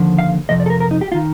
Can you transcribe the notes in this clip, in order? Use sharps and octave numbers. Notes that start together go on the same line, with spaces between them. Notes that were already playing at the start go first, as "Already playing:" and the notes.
Already playing: D#2 D3 F3
F5
F2 C3 F3 D#5
D5
A4
A#4
A#4
D#4
G4
F4
D#3